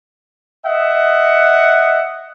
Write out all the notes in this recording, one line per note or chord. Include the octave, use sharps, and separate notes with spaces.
D#5 E5 F#5